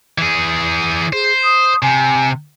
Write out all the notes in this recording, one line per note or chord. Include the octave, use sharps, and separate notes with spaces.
E3 G#4
G#4 C5
D#6
C3 G#5